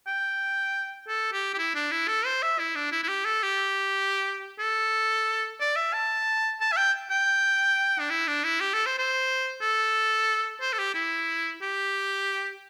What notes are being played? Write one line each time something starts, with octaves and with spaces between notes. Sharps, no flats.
G5
A4
G4
G4
E4
D4
E4
A4
C5
E5
E4
D4
E4
E4
G4
A4
G4
A4
D5
E5
A5
A5
E5
G5
G5
D4
E4
D4
E4
G4
A4
C5
C5
A4
C5
A4
G4
E4
G4